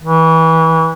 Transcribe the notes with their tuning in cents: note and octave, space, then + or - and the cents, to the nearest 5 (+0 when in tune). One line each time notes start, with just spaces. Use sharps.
E3 -25